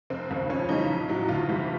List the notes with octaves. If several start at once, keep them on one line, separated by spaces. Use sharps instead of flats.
F1 C4
D#2 C#3
F2 C#4
C#3 E3 G3 D#4
A#1
A2 F#3
D2 F4
C3 E3 G3